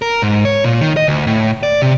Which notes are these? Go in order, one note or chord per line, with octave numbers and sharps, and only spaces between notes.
A#4
G#2
C#5
A#2
D#3
D#5
D2
A2
D5
C3